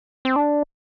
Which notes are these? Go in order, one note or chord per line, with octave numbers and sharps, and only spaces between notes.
C4
D4